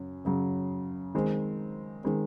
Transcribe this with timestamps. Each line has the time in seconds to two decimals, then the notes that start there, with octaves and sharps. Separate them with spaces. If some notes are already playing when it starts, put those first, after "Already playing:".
Already playing: F#2 C#3 F#3
0.25 F#2 C#3 F#3
1.15 D#3 G#3 C4
2.04 D#3 G#3 C4